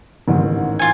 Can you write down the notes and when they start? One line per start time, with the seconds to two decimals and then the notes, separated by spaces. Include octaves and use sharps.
0.28 A1 G#2 D#3
0.79 F4 G#5